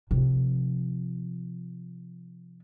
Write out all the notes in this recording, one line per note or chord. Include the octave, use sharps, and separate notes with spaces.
C3 F3